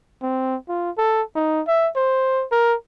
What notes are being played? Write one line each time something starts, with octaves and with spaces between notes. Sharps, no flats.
C4
F4
A4
D#4
E5
C5
A#4